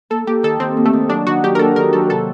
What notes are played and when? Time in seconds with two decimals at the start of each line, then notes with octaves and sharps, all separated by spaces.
0.10 A#3 A4
0.27 A#3 G4
0.43 D#3 A4
0.60 D#3 C4
0.77 A#3
0.86 A3
0.93 D#3
1.09 F#3 D4
1.27 D#3 F#4
1.43 F#3 G4
1.55 A#4
1.59 A#3 A4
1.76 D#3 A#4
1.93 F#3 A4
2.10 C3 A4